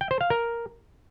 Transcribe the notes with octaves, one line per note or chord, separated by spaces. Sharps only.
G5
C5
F5
A#4